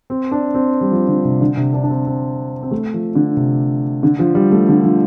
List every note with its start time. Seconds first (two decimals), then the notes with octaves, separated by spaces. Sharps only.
0.10 C4
0.31 D4
0.54 C4
0.81 G3
0.91 F3
1.08 D3
1.25 C3
1.41 D3
1.57 C3
1.73 D4
1.83 D4
1.90 C4
2.06 C4
2.63 C4
2.71 A3
2.94 F3
3.16 D3
3.37 C3
4.03 D3
4.19 F3
4.35 G3
4.52 A3
4.69 D3
4.84 F3